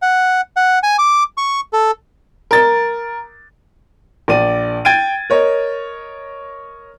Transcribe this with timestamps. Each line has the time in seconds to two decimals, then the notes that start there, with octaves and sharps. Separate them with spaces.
0.02 F#5
0.56 F#5
0.83 G#5
0.99 D6
1.37 C#6
1.73 A4
2.51 A#4 A6
4.28 A#1 D5 D#7
4.85 G5 G#6 A6 D7 D#7
5.30 A#4 C#5 D#5